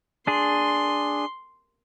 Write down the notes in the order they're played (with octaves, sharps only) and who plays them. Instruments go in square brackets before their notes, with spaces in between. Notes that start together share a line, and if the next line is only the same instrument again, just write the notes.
[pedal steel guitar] D4 G#4 [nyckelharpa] C6